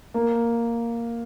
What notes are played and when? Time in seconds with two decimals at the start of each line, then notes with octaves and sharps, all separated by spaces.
0.14 A#3